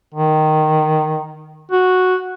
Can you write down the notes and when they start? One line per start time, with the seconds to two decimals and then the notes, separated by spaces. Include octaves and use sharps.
0.14 D#3
1.72 F#4